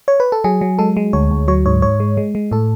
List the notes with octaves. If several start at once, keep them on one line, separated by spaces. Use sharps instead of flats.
C#5
B4
A4
F#3 G#4
F#3
G#3 A4
G#3
D2 C#5
D2
F#3 C#5
G#2 C#5
G#2 C#5
G#3
G#3
G#3
A2 A4